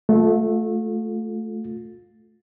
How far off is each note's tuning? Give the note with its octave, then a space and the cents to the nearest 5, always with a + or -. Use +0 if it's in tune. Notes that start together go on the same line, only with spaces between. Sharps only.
A3 -10 F4 +30